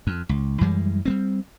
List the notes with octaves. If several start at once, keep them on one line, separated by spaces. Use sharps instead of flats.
F2
C#2
F#2 E3 G3 G#3
G3 A3 C4